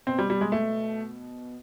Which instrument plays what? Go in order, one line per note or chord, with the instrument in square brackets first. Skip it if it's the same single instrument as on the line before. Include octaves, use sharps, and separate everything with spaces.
[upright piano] B2 C4
G3
G3
G#3
A3